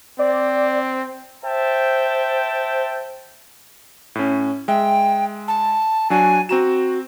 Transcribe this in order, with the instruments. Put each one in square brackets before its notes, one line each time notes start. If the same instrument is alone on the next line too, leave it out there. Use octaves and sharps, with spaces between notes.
[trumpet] C4 [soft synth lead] D5
[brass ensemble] C5 E5 G5 A5
[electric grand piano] A2 C#4
[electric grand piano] G#3 E5 [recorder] G5
[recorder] A5
[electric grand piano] F#3 D4 F#4 [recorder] G#5
[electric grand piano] C4 A#5 E7 [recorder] F#4